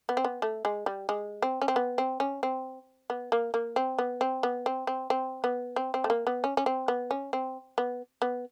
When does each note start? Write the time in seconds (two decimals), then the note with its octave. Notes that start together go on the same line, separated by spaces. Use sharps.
0.09 B3
0.17 C4
0.25 B3
0.42 A3
0.65 G#3
0.86 G3
1.09 G#3
1.42 C4
1.62 C#4
1.68 C4
1.76 B3
1.98 C4
2.20 C#4
2.43 C4
3.10 B3
3.32 A#3
3.54 A#3
3.76 C4
3.99 B3
4.21 C4
4.43 B3
4.66 C4
4.87 C4
5.10 C4
5.44 B3
5.76 C4
5.94 C4
6.04 A3
6.10 A#3
6.27 B3
6.44 C#4
6.57 C#4
6.66 C4
6.88 B3
7.11 C#4
7.33 C4
7.78 B3
8.22 B3